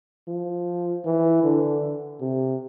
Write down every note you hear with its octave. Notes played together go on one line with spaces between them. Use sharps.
F3
E3
D3
C3